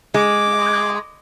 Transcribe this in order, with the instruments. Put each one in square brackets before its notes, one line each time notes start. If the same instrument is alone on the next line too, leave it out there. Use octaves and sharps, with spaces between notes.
[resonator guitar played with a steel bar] G#3 [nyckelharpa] D6